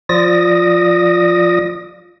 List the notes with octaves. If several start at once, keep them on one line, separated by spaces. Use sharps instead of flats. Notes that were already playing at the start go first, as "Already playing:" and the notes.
F3 F4 D5 D#6 A#6